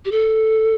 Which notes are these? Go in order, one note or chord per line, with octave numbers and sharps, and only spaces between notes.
G4
A4